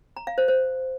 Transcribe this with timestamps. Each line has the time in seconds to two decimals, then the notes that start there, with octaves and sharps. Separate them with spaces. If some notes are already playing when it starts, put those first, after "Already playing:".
0.17 A#5
0.27 F5
0.38 C5
0.48 C5